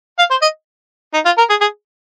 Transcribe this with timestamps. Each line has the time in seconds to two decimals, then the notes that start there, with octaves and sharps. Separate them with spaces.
0.19 F5
0.31 C5
0.42 D#5
1.14 D#4
1.26 F4
1.38 A#4
1.50 G#4
1.61 G#4